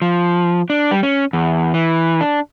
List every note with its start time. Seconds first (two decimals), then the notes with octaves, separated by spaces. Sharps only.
0.02 F3
0.70 D4
0.91 G3
1.03 C#4
1.33 E2
1.74 E3
2.21 D4